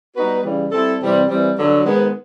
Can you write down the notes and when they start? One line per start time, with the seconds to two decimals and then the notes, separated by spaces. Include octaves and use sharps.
0.15 G3 B3 D#4 F#4 B4
0.44 C#3 E3 G3
0.72 G3 C4 E4 A4
1.00 C3 E3 G3 C4
1.28 E3 G3 C4
1.57 G2 D3 F#3
1.85 G#2 D#3 G#3 B3